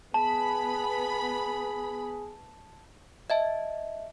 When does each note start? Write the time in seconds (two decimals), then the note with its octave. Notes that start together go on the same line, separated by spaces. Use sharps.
0.14 B3 G#4 A5 B5
3.30 D#5 E5 A5